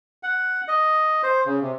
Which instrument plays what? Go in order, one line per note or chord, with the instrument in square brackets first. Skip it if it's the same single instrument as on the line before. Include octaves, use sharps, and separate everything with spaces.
[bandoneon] F#5
D#5
C5
C#3
C3